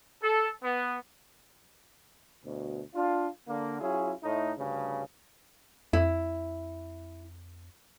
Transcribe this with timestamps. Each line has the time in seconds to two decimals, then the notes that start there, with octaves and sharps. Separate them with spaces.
0.21 A4
0.63 B3
2.44 D2 B2
2.95 D4 F4
3.48 D3 A#3
3.80 F#3 C#4 E4 F4 G#4
4.23 A2 A3 D#4
4.58 D2 G2 C#3
5.93 F2 E4